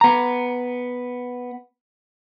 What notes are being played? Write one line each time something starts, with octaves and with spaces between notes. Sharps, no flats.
B3 A#5